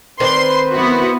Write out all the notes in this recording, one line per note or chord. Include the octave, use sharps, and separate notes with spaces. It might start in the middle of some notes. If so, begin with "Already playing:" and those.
D#3 C4 B4 C5 D5 C6
B3 E4 F#4